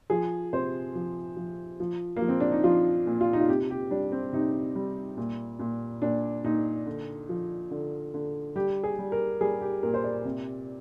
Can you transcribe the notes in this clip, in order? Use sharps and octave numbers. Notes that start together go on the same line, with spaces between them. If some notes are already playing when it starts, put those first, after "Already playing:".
F3 G#4
C3 C5
F3
F3
F3
A#3
F3
C4
D4
D#4
F3 F4
A#2
F4
D#4
F4
C3 G4
G4
G3 D4
C4
C3 D#4
G3
A#2
A#2
A#2 D4
A#2 D#4
D3
F3
D3
D3
G3 G4
G#4
G3
A#4
G3 G#4
G4
A#2 A#4
C5
D5
C3